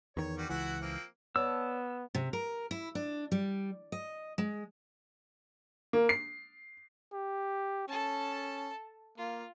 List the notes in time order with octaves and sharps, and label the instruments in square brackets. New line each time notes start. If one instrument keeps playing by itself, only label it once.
[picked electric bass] E2 D#3 [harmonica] C#5
[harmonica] G3 F#4
[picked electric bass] C#2 E3 [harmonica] E4 F#4 F#5
[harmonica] F3 A#3 C4
[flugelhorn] B3 [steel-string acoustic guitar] C#5 D5 A5 [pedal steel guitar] E6
[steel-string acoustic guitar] C3
A#4
E4
D4
G3
D#5
G#3
[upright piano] A#3
C7
[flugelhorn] G4
[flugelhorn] C#4 [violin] A4 A5
[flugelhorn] A#3 [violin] F4